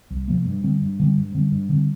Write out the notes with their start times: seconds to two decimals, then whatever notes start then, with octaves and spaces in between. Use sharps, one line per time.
0.10 C2
0.28 C3 F3 A#3
0.45 G2
0.64 D3 G3 C4
0.81 G2
0.99 D3 G3 C4
1.17 G2
1.35 D3 G3 C4
1.52 G2
1.69 D3 G3 C4